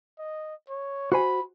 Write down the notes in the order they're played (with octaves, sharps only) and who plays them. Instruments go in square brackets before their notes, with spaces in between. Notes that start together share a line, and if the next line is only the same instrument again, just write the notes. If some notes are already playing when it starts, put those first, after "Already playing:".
[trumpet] D#5
C#5
[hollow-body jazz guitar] F#4 C5 G#5 [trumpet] B5